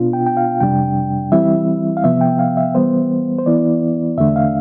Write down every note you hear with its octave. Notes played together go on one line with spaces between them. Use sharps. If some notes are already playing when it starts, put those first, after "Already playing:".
Already playing: B2 B3 D4 F4
G5
G5
F5
F2 C3 G3 D4 G5
E3 G3 C4 E4 E5
F5
C3 F3 B3 E5
G5
F5
E5
E3 G3 B3 C5
C5
E3 B3 E4 D5
E2 D3 A3 D4 E5
F5